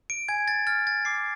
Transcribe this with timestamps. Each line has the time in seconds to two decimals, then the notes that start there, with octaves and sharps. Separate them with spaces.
0.10 D7
0.28 G#5 G#6
0.48 A6
0.67 F6 A6
0.87 A6
1.05 D6 C7